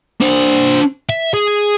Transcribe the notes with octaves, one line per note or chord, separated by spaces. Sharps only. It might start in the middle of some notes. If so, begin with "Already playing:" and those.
D4 C5
E5
G#4